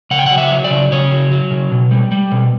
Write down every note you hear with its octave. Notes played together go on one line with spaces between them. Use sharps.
C#3 F#5
G5
F#5
F#3
E5
F#3
D5
C#3
C#3 C#5
F#3
F#3
C#3
B2
G3
G3
B2